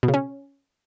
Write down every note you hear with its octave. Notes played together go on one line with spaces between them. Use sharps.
B2
C#3
C#4